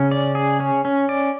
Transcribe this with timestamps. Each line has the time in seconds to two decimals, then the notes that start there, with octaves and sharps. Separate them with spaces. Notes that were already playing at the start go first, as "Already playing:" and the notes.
Already playing: C#3 C#4
0.11 D5
0.35 G#4
0.60 C#4
0.85 C#4
1.09 D5